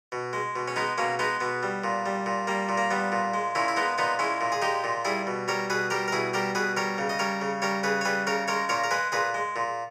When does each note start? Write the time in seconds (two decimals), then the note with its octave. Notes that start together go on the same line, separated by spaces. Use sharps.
0.12 B2
0.33 G#3
0.56 B2
0.68 C#4
0.76 G#3 B3 D#4
0.98 B2 A#3 C#4
1.19 G#3 B3 D#4
1.40 B2 B3
1.63 G3
1.84 A#2
2.06 G3
2.26 A#2
2.47 G3 A#3
2.69 A#2
2.78 A#3
2.91 G3 B3
3.12 A#2
3.34 G#3
3.55 A#2 C#4 E4
3.68 E4
3.76 G#3 B3 D#4
3.98 A#2 B3 D#4
4.19 G#3 C#4 E4
4.41 A#2
4.52 G#4
4.62 G#3 D#4 G4
4.84 A#2
5.05 G3 E4 G#4
5.27 B2
5.48 G3 A#4 C#5
5.70 B2 G#4 B4
5.90 G3 G4 A#4
6.08 A#4
6.12 B2 E4 G#4
6.34 G3 G4 A#4
6.55 B2 G#4 B4
6.77 G3 A#4 C#5
6.98 C#3
7.09 D#5
7.19 G3 A#4 C#5
7.41 C#3
7.62 G3 A#4 C#5
7.83 C#3 G#4 B4
8.01 C#5
8.05 G3 G#4 B4
8.27 C#3 A#4 C#5
8.48 G#3 A#4 C#5
8.69 A#2 A#4 C#5
8.84 A#4
8.91 G#3 G#4 B4
9.12 A#2 G#4 B4
9.34 G#3
9.56 A#2